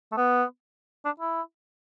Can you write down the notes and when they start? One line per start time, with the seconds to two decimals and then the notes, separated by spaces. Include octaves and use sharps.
0.12 A3
0.17 B3
1.05 D4
1.20 E4